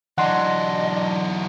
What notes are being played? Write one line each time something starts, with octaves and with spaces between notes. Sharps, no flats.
E3 F#3 D4 D#5 F#5 C6